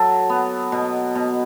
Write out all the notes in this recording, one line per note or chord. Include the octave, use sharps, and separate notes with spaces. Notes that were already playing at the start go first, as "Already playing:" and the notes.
Already playing: F#3 A4
B3
B2
B2